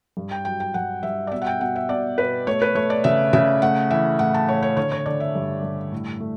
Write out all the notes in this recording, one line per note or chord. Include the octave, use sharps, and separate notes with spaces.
G2
G5
F#3 G5
G5
G2 F#5
G2 E5
D5
B2 E5
F#5
G5
B2 F#5
E5
B2 D5
B2 B4
A3 C#5
B4
A3 C#5
D5
C#3 E5
C#3 E5
A3 F#5
E3 E5
A2 F#5
A5
A2 C#5
C#5
D3 C#5
C#5
D3 D5
E5
G2
G2
A2
A3